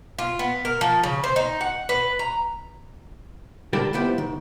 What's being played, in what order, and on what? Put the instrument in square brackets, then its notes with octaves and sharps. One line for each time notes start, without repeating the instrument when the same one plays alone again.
[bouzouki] F4
B3
A#4
F3
C#3
C5
D#4
F#5
B4
A#5
[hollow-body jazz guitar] D3 G3 G4 A4 A#4
C2 F3 B3 E4 G4 G5
D#3